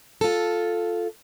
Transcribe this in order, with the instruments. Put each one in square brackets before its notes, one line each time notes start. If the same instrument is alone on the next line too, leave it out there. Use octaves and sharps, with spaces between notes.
[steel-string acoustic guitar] F4 A4